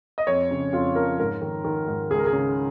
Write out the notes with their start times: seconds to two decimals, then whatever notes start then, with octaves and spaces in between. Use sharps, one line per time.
0.18 D#5
0.27 F2 C#5
0.51 C#3
0.73 F2 F4
0.96 F3 A#4
1.19 G#2 A#4
1.42 D#3
1.64 D#3
1.87 G#2
2.10 C#2 G#4
2.19 A#4
2.27 G#4
2.33 C#3